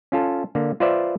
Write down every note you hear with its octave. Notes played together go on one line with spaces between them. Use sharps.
C#4 F4 A4
D3 A#3
F4 B4 C5 D5 E5